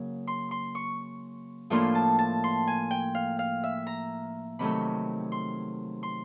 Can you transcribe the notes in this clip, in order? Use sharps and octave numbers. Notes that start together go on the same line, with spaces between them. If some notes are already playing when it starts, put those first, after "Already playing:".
Already playing: C#3 F#3 A#3
C6
C6
C#6
A2 F3 A#3 D4 F4 C6
A5
A5
C6
G#5
G5
F5
F5
E5
A#5
C3 D#3 F#3 A3 B5
C6
C6